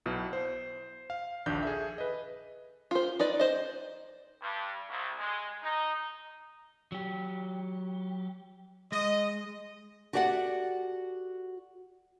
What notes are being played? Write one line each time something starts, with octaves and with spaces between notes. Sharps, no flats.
B1 B2 E4
C5
F5
A#1 D#2 D4 G6
G#4 A4 E5
B4 D#5
F4 C5
D#4 B4 D5
C5 D#5
G2
C2
G#3
D#4
F#3 G4
G#3 D#5
F#4 G4 A4 D5 F5 F#5